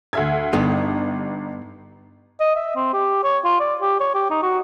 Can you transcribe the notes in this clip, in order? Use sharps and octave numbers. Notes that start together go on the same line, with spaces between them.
D2 E5 G#6
G1 G2 B3 D#4
D#5
E5
C4
G4
C#5
F4
D5
G4
C#5
G4
D#4
F#4